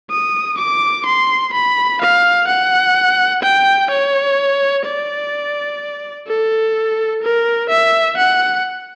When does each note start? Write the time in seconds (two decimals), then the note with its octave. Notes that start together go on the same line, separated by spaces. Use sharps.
0.11 D#6
0.58 D6
1.06 C6
1.53 B5
2.01 F5
2.48 F#5
3.43 G5
3.91 C#5
4.86 D5
6.28 A4
7.23 A#4
7.70 E5
8.17 F#5